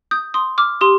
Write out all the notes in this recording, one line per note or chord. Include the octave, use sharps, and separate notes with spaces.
D#6 G6
C6 D#6
D6 F6
G4 C6 D#6